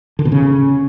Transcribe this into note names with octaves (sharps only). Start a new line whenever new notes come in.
D3
B2
C#3